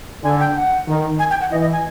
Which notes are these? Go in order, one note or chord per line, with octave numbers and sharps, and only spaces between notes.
D3 G#5
G5
F#5
D#3
G#5
G5
F#5
E3 D#5
D#5
G#5